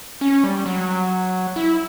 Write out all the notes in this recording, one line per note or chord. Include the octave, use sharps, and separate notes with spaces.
C#4
G3
F#3
E4